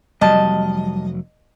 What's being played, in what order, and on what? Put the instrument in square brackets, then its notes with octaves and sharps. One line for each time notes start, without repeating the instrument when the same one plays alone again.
[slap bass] F1 F#3 [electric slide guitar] G3 A5 [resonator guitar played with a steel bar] D#5